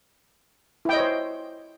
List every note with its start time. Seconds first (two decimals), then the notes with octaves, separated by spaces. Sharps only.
0.85 E4
0.89 G5
0.93 D#5
0.97 C#5
1.00 C5